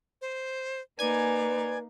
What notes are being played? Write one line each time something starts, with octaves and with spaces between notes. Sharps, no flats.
C5
A#3 D#4 B4 D5 G#5 G#6